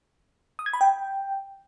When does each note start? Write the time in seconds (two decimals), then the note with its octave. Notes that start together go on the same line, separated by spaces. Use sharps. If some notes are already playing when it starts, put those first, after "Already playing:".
0.59 D#6
0.66 G#6
0.73 B5
0.81 G5